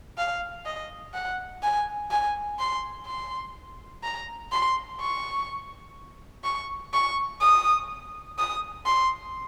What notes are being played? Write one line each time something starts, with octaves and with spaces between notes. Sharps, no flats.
F5
D#5
F#5
G#5
G#5
C6
C6
A#5
C6
C#6
C#6
C#6
D#6
D#6
C6